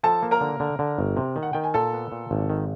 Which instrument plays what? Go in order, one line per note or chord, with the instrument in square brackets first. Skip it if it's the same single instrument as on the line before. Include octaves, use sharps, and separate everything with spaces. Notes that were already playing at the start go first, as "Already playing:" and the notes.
[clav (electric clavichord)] F3 [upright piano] A4 A5
[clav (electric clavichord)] A#3
[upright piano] A#4 A#5
[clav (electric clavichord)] D3
D3
D3
G1
C3
D#3
[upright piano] F#5
[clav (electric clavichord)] D#3 [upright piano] G5
[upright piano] G#5
[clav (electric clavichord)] A#2 [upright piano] A4 A5
[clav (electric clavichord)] B3
A#2
G#1
D#3